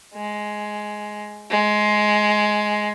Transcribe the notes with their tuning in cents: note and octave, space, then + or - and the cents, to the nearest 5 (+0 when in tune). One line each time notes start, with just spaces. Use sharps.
G#3 +10
G#3 +15